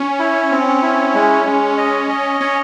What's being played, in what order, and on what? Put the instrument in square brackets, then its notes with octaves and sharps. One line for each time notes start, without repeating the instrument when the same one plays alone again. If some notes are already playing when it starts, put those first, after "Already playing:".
Already playing: [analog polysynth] C#4
[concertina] E4
C4
E4
G#3
G#3
D#5
D#5
[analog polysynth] C#4 [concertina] C#5